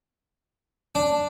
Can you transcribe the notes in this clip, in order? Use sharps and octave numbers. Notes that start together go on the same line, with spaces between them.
D4